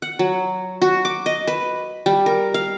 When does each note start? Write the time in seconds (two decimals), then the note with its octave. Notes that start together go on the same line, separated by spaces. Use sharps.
0.02 F#5
0.19 F#3
0.82 F#4
1.05 D6
1.26 D#5
1.47 B4
2.06 G3
2.26 A#4
2.54 F5